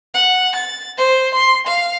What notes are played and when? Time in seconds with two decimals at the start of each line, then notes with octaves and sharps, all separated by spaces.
0.14 F#5
0.55 A6
0.98 C5
1.34 C6
1.67 F5